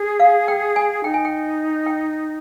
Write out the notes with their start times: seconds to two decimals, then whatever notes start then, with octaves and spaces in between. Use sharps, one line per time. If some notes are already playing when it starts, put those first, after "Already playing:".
Already playing: G#4
0.20 F5
0.48 G5
0.76 G#5
1.04 D#4 G5
1.14 G#5
1.25 G5
1.86 G5